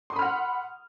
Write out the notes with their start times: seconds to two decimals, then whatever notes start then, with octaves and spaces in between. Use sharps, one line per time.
0.10 C6
0.13 D#6
0.16 B5
0.19 F6
0.22 F#5